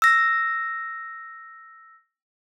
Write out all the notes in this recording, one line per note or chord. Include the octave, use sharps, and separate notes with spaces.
E6 A#6